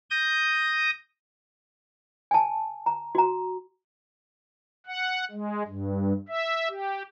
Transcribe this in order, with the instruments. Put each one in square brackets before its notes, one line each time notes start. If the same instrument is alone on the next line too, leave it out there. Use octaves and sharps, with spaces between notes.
[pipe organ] D#6 G6 A#6
[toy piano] G#5 A5
A#5
F#4 A#5
[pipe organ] F#5
G#3
G2
E5
G4